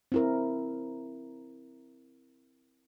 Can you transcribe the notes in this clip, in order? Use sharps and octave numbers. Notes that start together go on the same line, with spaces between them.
C4 E4 A#4